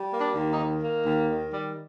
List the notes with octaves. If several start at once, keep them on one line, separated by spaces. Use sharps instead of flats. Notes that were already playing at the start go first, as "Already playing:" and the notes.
Already playing: G3
A#3
D4
D#2
D#4
D#3
A#3
D#2
D#3
G3